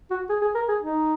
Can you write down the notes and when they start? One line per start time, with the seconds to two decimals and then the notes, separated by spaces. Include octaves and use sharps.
0.11 F#4
0.29 G#4
0.42 G#4
0.55 A#4
0.68 G#4
0.82 D#4